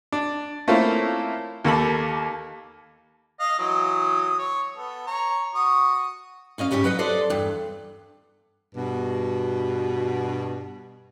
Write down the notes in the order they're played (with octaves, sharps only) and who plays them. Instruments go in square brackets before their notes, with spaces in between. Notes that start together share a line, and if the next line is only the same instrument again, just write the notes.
[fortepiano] D4
A3 A#3 C4 C#4 E4 F4
D#2 A#3 A4 B5
[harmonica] D#5 F5
E3 F#3 D#6
C#5
B3 A4
C#5 A#5
F#4 C#6 D#6
[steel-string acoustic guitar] F#2 C#4 D#5 F5
G#2 C#3 G4 C#5 G#5
F#3 B4 D#5 F#5
A4 C5 D5 D#5
E2 G2
[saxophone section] G2 B2